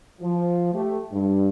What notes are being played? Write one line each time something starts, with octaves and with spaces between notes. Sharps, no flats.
F3
A3 G4
G2